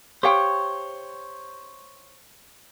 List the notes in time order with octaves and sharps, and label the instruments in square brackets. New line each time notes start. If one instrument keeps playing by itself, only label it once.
[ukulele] G4 F5 G5 [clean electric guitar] C5 C#5